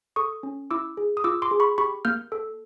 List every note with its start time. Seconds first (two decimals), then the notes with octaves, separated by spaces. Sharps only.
0.16 A4 C#6 D#6
0.43 C#4
0.71 E4 D6 E6
0.97 G#4
1.17 D#6
1.24 F4 D6 E6
1.42 C6 D6
1.51 G#4
1.60 B5 C#6
1.78 G4 B5 C#6
2.05 A#3 F6 G6
2.32 A4